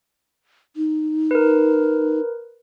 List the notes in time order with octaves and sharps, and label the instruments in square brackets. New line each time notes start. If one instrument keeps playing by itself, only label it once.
[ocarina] D#4
[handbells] A#4 B4